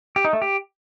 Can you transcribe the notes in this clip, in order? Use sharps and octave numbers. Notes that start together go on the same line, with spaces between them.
G4
D#4
A3
G4